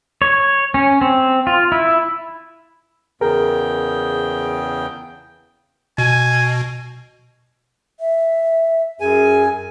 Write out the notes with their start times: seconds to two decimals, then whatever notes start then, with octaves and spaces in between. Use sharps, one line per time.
0.22 C#5
0.74 C#4
1.01 C4
1.47 F4
1.72 E4
3.21 E2 C#3 G#4 A#4 G5
5.98 B2 G#5
8.00 E5
9.01 F#2 G#4 G#5